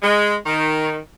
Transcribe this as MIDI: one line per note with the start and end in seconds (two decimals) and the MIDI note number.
0.02 0.35 56
0.46 0.98 51